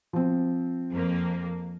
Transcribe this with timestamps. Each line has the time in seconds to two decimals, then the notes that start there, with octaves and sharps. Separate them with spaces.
0.13 F3 C4
0.92 F2 A#3